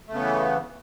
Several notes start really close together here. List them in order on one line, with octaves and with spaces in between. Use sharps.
A3 C#3 B3 E3